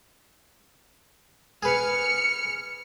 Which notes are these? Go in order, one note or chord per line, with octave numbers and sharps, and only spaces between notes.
G#4 B4 F6 C#7